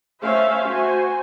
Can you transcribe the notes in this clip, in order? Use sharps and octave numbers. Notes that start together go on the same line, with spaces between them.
A3 C#4 C5 E5 F5
F#4 C5 G#5